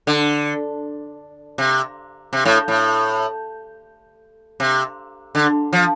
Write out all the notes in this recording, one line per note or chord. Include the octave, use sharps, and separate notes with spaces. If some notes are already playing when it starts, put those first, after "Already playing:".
D3
C3
C3
A2
A2
C3
D3
F3